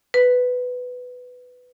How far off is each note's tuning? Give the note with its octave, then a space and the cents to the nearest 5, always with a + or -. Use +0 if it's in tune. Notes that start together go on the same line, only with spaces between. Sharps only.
B4 +10